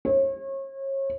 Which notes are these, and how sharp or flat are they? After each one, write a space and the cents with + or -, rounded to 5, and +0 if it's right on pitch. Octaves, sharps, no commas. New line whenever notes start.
C#5 -35